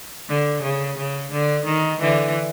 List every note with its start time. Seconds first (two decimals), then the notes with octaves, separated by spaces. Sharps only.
0.28 D3
0.63 C#3
0.98 C#3
1.31 D3
1.66 D#3
2.00 D3 E3